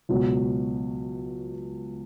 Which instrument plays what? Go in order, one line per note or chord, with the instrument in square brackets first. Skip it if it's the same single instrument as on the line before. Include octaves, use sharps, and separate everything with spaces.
[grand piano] C#2 B2 F#3